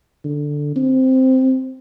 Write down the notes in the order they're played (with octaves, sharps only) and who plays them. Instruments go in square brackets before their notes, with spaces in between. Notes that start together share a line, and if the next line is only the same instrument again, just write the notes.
[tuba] D3
C4